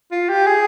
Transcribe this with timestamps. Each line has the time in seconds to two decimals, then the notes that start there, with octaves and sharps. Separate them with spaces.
0.11 F4
0.29 G4
0.46 G#4